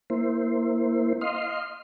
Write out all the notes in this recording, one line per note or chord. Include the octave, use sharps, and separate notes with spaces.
A#3 E4 C5
D#5 F5 C6